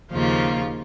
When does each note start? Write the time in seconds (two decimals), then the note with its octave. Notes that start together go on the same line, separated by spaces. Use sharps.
0.12 D#2 C#3 F3 A#3 F4